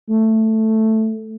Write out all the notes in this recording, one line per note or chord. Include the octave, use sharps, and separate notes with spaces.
A3